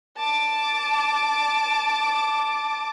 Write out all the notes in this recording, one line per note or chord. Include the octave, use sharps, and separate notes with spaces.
A5 D6